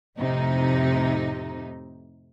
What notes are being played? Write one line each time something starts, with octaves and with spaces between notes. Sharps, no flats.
F2 A2 C3 D#4